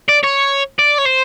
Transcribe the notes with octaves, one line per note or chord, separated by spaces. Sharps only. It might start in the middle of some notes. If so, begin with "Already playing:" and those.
D5
C#5
D5
C#5
C5